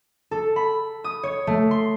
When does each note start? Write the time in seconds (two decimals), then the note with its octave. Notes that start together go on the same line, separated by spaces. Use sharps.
0.31 A4
0.56 B5
1.04 D#6
1.23 C#5
1.47 A3
1.71 C6